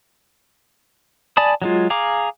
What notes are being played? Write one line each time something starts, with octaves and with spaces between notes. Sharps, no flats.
D5 G#5 A5 B5 D#6
F#3 G#3 F4
G#4 F5 A#5 D6